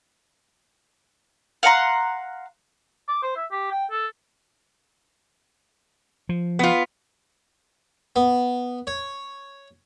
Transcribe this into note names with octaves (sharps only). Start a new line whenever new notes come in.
F5 F#5 A#5 C6
D6
C5
E5
G4
G5
A4
F3
B3 F4
B3
C#5